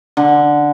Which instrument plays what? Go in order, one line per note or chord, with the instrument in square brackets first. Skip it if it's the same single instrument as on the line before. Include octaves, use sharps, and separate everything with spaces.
[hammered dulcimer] D3